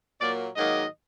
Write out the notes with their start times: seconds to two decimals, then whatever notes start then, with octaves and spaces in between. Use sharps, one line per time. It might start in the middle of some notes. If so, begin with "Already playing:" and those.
0.20 A#2 F#3 A#3 D5
0.56 G#2 D#3 F#3 A#3 D#5